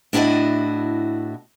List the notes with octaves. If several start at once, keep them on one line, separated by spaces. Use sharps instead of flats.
A2 D4 E4 F#4 D#5